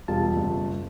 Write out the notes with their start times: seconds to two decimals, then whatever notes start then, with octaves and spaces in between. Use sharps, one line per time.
0.08 E1 G3 F4 A5
0.36 F#1